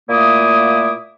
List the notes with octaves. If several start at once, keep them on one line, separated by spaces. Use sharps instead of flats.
A#2 A3 A#3 E4 D6 D#6